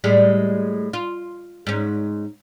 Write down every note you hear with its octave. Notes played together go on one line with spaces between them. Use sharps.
A2 G3 G#3
F4
G#2 C#4